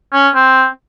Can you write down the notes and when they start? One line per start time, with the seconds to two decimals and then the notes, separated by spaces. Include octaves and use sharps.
0.13 C#4
0.35 C4